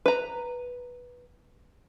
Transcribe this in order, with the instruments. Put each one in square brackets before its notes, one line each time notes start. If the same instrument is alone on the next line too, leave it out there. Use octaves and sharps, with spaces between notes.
[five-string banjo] B4 A#5